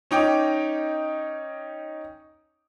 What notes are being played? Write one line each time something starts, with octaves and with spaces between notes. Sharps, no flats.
C#4 D#4 G5 D6